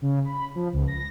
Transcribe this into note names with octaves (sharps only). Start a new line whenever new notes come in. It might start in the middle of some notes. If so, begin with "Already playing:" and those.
C#3
B5
F3
C#2
A#6